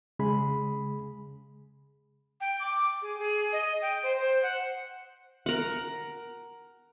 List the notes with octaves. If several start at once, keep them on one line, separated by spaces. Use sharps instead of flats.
C#3 G#3 G#4 B5
G5
D6
G#4
G#4
D#5
G5
C5
C5
F#5
A#4 F#5